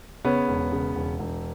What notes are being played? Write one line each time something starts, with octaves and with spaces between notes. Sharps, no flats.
C#3 B3 C#4
E1
C#3
E1
E1